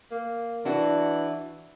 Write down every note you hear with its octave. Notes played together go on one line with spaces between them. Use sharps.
A#3
E3 D4 F#4